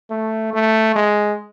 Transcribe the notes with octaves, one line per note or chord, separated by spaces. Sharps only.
A3
A3
G#3